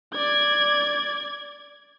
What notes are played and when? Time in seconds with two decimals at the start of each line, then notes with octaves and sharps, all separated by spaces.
0.13 D5 G#6